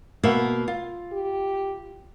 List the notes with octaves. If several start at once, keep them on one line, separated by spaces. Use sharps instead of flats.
B2 A#3 E5
F4
G4